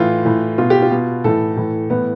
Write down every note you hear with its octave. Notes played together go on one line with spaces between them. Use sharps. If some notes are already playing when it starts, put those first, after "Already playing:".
Already playing: A2 E3 F4
A2 E3
B2 F4
G4
F4
B2
A2 E3 A4
A2 E3
A2 E3 B3